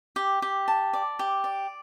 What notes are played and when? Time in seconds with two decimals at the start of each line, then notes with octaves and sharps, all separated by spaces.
0.16 G4
0.42 G4
0.68 A5
0.93 D5
1.19 G4
1.44 D5